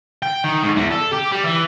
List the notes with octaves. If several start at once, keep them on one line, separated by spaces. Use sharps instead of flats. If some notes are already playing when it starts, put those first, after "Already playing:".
G5
D#3
G#2
E2
A4
G4
G3
E3